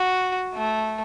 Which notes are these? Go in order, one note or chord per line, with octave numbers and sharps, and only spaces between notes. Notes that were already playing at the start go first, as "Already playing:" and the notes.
Already playing: F#4
A3